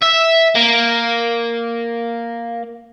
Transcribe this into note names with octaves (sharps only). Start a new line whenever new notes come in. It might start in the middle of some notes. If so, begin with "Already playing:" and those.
E5
A#3